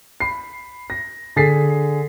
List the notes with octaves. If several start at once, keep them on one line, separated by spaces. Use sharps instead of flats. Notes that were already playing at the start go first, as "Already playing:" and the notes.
B5 C7
A#6
D3 G#4 A6 B6 C7